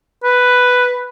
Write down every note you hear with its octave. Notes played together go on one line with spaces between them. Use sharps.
B4